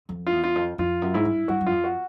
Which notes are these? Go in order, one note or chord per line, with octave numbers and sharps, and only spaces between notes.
F2
F4
E2
F4
F2
F2 F4
F#2
G#2 E4
G2
G2 F#4
F#2
F4
F2
F#4